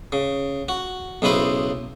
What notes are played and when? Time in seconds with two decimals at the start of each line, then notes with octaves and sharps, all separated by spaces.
0.12 C#3
0.69 F#4
1.22 B1 C#3 E4 B4 C5